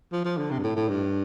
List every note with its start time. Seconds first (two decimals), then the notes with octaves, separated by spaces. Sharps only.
0.12 F3
0.25 F3
0.38 D3
0.51 C3
0.59 G2
0.63 A2
0.76 A2
0.89 G2